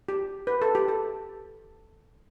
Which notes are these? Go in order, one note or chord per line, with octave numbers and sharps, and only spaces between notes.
G4
B4
A4
G4
A4